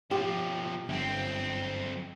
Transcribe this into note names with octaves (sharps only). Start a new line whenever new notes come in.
B1 F3 G4
G1 F#2 C4 G5